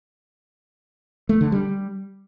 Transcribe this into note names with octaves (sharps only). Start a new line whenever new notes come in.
A3
D3
G3